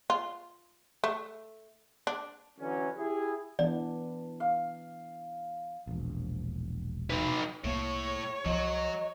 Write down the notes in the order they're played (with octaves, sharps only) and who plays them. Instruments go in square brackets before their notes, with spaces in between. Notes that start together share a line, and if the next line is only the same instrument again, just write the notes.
[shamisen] F4
A3
D4
[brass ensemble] D3 E3 F#3 C#4
E4 G4 G#4
[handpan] E3 B3 D4 [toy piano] D5
[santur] F5
[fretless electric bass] E1 A#1
[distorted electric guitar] D#4 B4
[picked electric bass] C2 A#3 [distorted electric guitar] A2 [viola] C#5
[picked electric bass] C2 F3 [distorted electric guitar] F#3 [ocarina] D#5